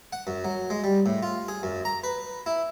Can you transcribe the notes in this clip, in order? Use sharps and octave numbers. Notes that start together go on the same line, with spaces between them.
F#5
F#2
F#3
G#3
G3
A2
F4
G#4
F#2
A#5
B4
E4